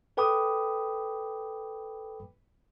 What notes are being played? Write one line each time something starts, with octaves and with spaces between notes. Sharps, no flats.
A4 B4 G5 B5 D6 D#6